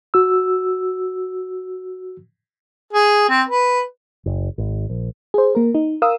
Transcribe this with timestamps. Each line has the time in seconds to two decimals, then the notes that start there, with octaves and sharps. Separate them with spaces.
0.14 F#4 E6
2.93 G#4
3.29 C4
3.49 B4
4.26 F#1
4.58 G#1
4.90 A#1
5.34 G#4 C5
5.55 A#3 A#4
5.75 D#4
6.02 A#4 F5 D#6 E6